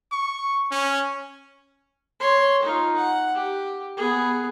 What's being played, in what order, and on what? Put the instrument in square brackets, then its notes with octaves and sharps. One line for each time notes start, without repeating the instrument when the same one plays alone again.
[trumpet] C#6
C#4
[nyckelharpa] C#5 C6
D#4 F4
F#5
G4
B3 G#4